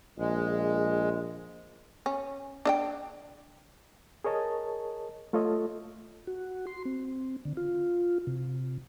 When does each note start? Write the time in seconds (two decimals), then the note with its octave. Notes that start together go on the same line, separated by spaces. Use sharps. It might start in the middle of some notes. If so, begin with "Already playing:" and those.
0.18 A#1 G#3
2.06 C#4
2.65 D4 D#5 G5
4.24 G#4 A#4 C#5 D#5 A5
5.33 A3 F4 A4 C#5 D#5
6.27 F#4
6.67 C6
6.85 C4
7.45 D3
7.57 F4
8.27 C3